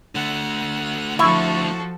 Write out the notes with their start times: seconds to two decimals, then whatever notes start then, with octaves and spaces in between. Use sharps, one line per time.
0.15 D3 A3 F#5
1.19 F3 E4 F#4 A4 C#6